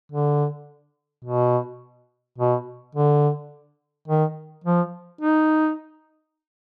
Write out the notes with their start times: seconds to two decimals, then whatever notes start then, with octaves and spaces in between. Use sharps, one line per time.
0.12 D3
1.25 B2
2.38 B2
2.95 D3
4.08 D#3
4.64 F3
5.21 D#4